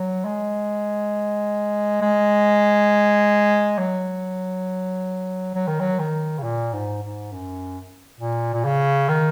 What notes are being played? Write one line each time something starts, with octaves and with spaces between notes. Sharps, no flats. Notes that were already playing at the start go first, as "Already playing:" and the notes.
Already playing: F#3
G#3
G#3
F#3
F#3
D#3
F#3
D#3
C#3
A#2
G#2
G#2
F#2
A#2
A#2
C#3
D#3